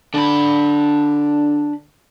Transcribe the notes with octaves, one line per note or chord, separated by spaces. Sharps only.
D3 D4 B5